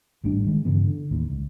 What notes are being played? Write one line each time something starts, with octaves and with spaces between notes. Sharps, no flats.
G#1 A2 G3 D4
D#3 G#3
G2 C#3 E3 B3
D3
D1 A1 D#2
C#2